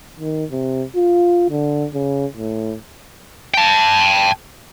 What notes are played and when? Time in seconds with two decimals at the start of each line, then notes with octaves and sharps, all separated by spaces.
0.20 D#3
0.51 C3
0.96 F4
1.50 D3
1.94 C#3
2.36 A2
3.54 G5 A5